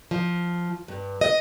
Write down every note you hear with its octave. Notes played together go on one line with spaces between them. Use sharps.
F3
G2
D#5